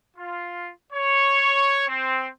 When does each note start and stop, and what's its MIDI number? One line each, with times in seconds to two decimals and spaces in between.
0.17 0.71 65
0.93 1.87 73
1.88 2.28 60